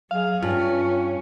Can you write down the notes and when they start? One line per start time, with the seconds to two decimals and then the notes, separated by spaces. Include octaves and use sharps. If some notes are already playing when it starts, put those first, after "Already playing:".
0.11 F#3 G#4 F5
0.42 G2 C#4 F4